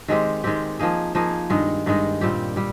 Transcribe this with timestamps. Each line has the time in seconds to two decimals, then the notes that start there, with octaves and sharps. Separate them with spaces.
0.08 D#3 G#3 C4 G4
0.44 D#3 G#3 C4 G4
0.80 F3 A#3 D#4 G#4
1.15 F3 A#3 D#4 G#4
1.50 G2 D#3 G#3 D#4
1.86 G2 D#3 G#3 D#4
2.21 A#2 G3 C4 G4
2.56 A#2 G3